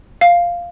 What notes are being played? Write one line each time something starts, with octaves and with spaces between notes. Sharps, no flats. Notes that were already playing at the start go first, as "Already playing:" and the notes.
F5